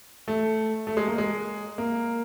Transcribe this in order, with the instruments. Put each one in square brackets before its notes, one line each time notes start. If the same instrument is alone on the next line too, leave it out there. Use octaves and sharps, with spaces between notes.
[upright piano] A3
A3
G#3
A#3
G#3
A#3